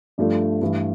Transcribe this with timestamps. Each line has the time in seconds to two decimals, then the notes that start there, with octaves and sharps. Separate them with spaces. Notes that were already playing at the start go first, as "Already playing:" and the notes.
0.18 G2 F3 A3 D5
0.61 G2 E3 A3